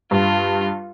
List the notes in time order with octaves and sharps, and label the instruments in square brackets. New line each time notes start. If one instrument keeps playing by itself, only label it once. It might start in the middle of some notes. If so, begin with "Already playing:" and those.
[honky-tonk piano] G2 [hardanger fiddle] F4